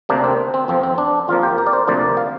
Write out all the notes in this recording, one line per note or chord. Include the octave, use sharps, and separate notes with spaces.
D2 C3 A#3 D4
C4
C4
F2 F3 C4
C4
D4
F2 F3 A#3 F4
G4
A#4
D5
C5
D2 C3 F3 A#3 D5
F5